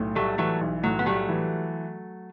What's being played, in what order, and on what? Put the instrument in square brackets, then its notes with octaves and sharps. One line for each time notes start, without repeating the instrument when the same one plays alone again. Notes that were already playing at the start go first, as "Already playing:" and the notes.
Already playing: [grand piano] B1 A2
[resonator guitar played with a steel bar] F#3 A3 [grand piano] G3
[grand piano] E3 [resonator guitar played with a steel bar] F#3 A3
[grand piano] B1
[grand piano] A2 [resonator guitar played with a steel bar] F#3
[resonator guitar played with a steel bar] B3
[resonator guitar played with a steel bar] F#3 A3 [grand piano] G3
[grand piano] E3